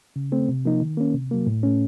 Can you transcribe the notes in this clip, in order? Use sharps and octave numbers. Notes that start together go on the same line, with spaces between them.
C#3
A3 C4
C3
F3 A#3 D#4
D#3
A#3 C#4
C3
F#3 A#3
A2
A3 C#4